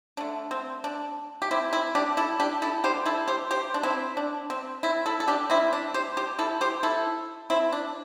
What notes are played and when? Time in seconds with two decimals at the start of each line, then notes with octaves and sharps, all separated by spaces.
0.17 D3 A3 D4
0.51 C4
0.84 D4
1.42 G4
1.51 C4 E4
1.73 C4 E4
1.95 D4 G4
2.17 E4 A4
2.40 D4 G4
2.62 E4 A4
2.84 D3 G3 G4 C5
3.06 E4 A4
3.28 G4 C5
3.51 G4 C5
3.74 D4
3.83 C4 E4
4.17 D4
4.50 C4
4.83 C4 E4
5.06 E4 A4
5.20 A4
5.28 D4 G4
5.50 C3 G3 C4 E4
5.73 D4
5.94 G4 C5
6.17 G4 C5
6.39 E4 A4
6.61 G4 C5
6.83 E4 A4
7.50 C4 E4
7.72 D4